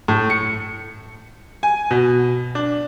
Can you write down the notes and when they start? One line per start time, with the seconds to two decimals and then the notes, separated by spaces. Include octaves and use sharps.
0.08 A2
0.30 C#7
1.63 G#5
1.91 B2
2.55 D4